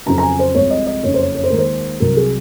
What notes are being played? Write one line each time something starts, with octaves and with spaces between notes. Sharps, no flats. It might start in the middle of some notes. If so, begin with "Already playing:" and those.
F2 C#3 F#3 A#5
A#5
G#5
C5
C2 C3 F3 G#3 C#5
D#5
D#5
F#1 F2 C#3 C#5
C5
C#5
C#5
C5
D#2 D#3 G#3 A#4
C5
C2 C3 F#3 A#4
G#4